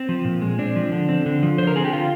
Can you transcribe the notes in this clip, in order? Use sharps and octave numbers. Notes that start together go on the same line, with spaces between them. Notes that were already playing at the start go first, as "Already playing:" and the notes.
Already playing: C4
F3
A#2
G#3
C4 D4
F3
D3
C4
D3
F3
D3 C5
A#4
C4 G#4
G4
D3 F4